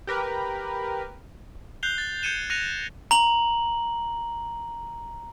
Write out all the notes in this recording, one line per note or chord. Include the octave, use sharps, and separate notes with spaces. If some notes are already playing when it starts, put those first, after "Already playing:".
G4 A#4 B4
F#6 G6 C7 F7 G7
A6
G6 G#6 C#7 D#7 E7 G7
F#6 A#6 C#7 D#7 F7
A#5 F#7